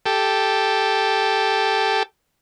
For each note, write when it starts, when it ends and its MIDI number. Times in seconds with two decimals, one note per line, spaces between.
0.06 2.03 67
0.06 2.03 69